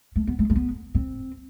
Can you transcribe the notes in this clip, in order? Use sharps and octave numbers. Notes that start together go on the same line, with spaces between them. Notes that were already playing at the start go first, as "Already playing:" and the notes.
A3
B3
A3
A3
B3
C4